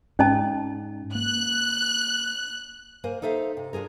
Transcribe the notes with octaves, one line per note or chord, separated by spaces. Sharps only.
G#2 C#4 D#5 A5
A#3 F#6
A#3 A#4 C5 G#5
D#4 A4 C5 E5 F5
C3
D4 F4 G#4 A#4